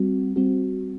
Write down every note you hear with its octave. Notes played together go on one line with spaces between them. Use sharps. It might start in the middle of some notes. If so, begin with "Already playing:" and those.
Already playing: G3 C4 F#4
G3 C4 F#4